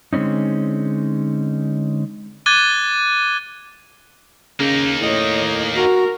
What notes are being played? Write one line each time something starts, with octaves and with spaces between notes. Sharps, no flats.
D3 G#3 C4 C#4 D#4
D6 F#6 G#6 A6 D#7 G7
C#3 A#3 D#4
A2 C#5 D#5
F#4 A#4